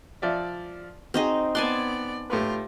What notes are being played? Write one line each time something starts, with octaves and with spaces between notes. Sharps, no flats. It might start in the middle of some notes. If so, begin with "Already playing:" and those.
F3 D5 E5
C4 D#4 F#4 G#4 D#5
B3 D5 G#5 A5 C6 F#6
A2 F4 G4 B4